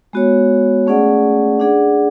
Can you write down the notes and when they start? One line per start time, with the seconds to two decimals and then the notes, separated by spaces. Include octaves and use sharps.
0.13 G#3 B3 F#4 C#5
0.87 A3 C#4 G#4 D5 F#5
1.60 D4 G#4 D5 F#5